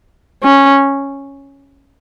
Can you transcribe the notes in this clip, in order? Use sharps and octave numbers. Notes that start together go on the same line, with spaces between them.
C#4